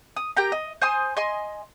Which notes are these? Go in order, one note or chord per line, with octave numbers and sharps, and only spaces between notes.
D#6
G4 A#4 G5 A#5
D#5
C5 G#5 C6 D#6
D#5 G#5 C6